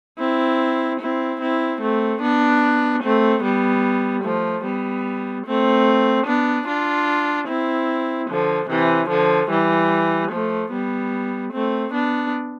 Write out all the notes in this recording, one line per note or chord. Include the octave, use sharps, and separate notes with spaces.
C4 E4
C4 E4
C4 E4
A3 C4
B3 D4
A3 C4
G3 B3
F3 A3
G3 B3
A3 C4
B3 D4
D4 F4
C4 E4
D3 F3
C3 E3
D3 F3
E3 G3
F3 A3
G3 B3
A3 C4
B3 D4